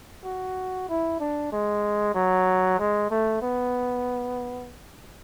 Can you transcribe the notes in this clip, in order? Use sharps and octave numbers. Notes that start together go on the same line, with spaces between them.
F#4
E4
D4
G#3
F#3
G#3
A3
B3